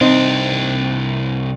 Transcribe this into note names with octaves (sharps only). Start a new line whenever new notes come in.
C2 C4 D4 D#4